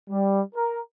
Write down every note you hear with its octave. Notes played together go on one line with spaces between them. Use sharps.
G3
A#4